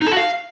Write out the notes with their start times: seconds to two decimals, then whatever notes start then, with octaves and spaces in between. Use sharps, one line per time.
0.01 D#4
0.06 A4
0.12 F#4
0.17 F5